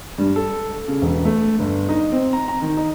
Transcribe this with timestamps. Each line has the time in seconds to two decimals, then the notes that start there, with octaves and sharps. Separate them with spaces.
0.18 G2
0.36 A4
0.88 C#3
1.02 E1
1.25 A3
1.59 G1
1.89 D#4
2.12 C4
2.33 A#5
2.48 A#5
2.62 D#3
2.77 D#4